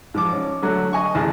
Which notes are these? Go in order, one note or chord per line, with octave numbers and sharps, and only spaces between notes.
G#2 F3 D6
C#4
D3 F#3 A3
D#5 G#5 C#6
A1 D2 G#4 A5